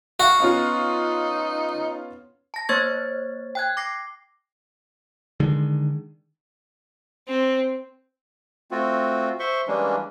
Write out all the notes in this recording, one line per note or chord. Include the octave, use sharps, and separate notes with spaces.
F#4 F5
B3 C#4 D#4 F4
A5 A#6
A#3 C5 C#5 C#6 G#6 A6
G5 F#6 G#6
D6 A#6 C7
D3 D#3 G#3
C4
A3 C4 F4 F#4
C5 E5 C6 C#6
E3 G3 G#3 A#3 C#4 D4